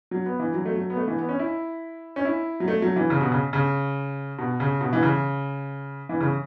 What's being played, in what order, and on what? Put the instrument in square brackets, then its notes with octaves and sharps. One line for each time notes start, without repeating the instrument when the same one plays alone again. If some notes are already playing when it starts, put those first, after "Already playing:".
[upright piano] F#3
B3
E3
F#3
A3
F#3
B3
A3
E3
B3
C#4
E4
C#4
E4
F#3
A3
F#3
E3
C#3
B2
C#3
C#3
B2
C#3
B2
E3
C#3
E3
C#3